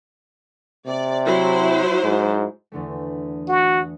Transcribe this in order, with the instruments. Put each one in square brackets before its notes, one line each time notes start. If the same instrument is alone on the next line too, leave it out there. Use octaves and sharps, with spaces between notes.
[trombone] C3 [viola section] D5
[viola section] F#3 E4 C5
[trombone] G#2
[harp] E2 D3 A3
[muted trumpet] F#4